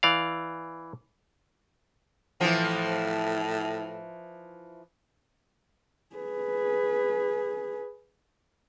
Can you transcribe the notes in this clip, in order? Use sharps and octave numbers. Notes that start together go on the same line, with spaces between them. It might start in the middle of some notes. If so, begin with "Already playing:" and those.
E3 D5 F5
A2 E3 F3
G#4 B4